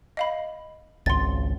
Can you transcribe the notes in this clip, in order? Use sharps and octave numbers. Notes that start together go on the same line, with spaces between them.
D#5 F5 B5
G#1 C#2 C6 A6